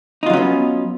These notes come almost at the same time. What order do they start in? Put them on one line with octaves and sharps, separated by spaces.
D#4 F4 F#3 C#4 B3